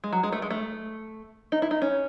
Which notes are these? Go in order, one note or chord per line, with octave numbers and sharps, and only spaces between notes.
G#3
F#3
G#3
A3
G#3
A3
D#4
E4
D#4
C#4